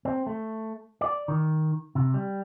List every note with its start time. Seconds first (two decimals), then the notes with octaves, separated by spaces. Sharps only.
0.05 C4
0.27 A3
1.01 D5
1.28 D#3
1.95 C3
2.14 G3